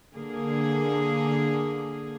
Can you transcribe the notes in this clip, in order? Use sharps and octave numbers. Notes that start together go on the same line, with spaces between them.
D3 A#3 G#4